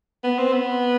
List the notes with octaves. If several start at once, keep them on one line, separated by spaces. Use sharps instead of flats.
B3
C4
B3